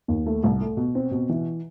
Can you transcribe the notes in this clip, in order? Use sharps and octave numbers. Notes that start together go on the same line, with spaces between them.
D#2
A3
C2
A3
B2
C4
B2
E3